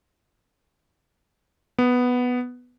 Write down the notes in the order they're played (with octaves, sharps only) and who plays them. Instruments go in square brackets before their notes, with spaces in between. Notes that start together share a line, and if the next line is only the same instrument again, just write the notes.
[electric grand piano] B3